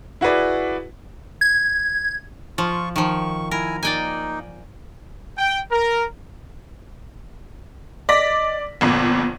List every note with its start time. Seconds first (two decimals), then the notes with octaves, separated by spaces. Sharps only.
0.21 E4 F#4 G#4 B4 D5
1.41 G#6
2.58 F3 F4 C#6
2.96 D#3 F3 C#6
3.51 E4 A#4 G#5
3.83 A#3 D#4 D5 G5 G#5
5.37 G5
5.71 A#4
8.09 D5 D#5 A#6 B6
8.81 G1 F2 A#2 B3